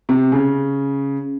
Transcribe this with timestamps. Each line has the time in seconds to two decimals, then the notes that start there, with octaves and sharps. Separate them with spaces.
0.09 C3
0.32 C#3